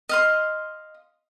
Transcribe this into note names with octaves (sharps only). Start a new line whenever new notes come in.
D#5 F5 C6